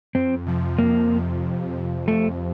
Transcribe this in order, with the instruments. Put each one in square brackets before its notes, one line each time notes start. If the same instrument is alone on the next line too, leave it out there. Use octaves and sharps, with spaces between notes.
[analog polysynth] F2 [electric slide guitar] C4
[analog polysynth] C3 F3
[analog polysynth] F2 [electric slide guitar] A#3
[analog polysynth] C3 F3
F2
C3 F3
[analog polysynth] F2 [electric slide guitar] A3